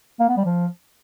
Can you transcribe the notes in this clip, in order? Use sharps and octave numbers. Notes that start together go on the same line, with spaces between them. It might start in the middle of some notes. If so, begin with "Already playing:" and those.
A#3
B3
G3
F3